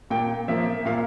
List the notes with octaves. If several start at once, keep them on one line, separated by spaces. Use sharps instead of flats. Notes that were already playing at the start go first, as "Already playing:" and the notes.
A#2 G5
F3 A#3 E5
A#2 F5